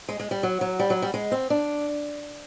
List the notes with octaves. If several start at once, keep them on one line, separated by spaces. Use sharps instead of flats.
G#3
G#3
G3
F#3
F#3
G3
F#3
G3
G#3
C4
D4